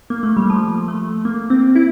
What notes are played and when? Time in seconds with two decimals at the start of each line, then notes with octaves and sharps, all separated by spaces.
0.10 A#3
0.23 A3
0.37 G3
0.50 F3
0.88 A3
1.25 A#3
1.50 C4
1.76 E4